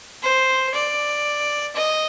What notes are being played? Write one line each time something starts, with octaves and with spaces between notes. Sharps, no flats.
C5
D5
D#5